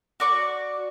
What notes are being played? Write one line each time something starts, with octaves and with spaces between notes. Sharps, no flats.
F#4 D5 C#6